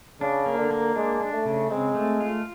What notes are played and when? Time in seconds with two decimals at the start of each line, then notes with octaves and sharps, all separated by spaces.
0.21 C#3 D4
0.46 A#3
0.58 D3
0.71 A#3
0.96 G#3 D4
1.21 D4
1.33 A3
1.45 C#3
1.70 G#3 C4
1.94 A3
2.20 F4